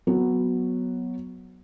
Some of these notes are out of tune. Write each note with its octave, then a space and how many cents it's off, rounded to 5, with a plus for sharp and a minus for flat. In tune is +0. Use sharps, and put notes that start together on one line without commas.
F#3 -5 B3 +0